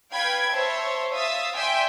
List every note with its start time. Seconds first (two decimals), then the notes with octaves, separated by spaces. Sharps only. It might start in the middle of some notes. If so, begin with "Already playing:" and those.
0.13 B4 F5 G5 B5 G#6
0.52 C5 C#5 E5 A5
1.14 E5 F5 D#6 A6
1.56 D5 E5 G5 G#5 C6